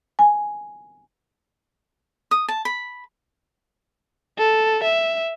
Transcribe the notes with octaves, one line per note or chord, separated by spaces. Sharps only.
G#5
D#6
A5
B5
A4
E5